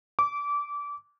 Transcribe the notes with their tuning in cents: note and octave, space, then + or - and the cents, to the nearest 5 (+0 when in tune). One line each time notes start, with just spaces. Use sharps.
D6 -20